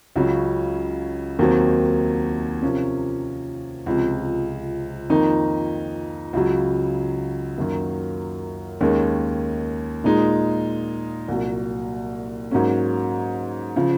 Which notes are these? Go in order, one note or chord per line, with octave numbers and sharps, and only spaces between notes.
C#2 C#3 F#3 C#4
D#2 D#3 F#3 C4
C3 F3 A#3 C#4
C#2 C3 F3
F2 D#3 A#3 D#4
C#2 C#3 F#3
F#2 D#3 F#3 A#3
D#2 D#3 G#3 C#4
A#2 G#3 D#4
C2 A#2 F#3
G#2 F#3 A#3 C#4
C#3 F3